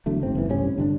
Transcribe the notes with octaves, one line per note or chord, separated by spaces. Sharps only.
E2 D3 F#3 A3
G#1 G#2 C4
F#1 E3
A1 G2 C3 C#4
G2 D3 D4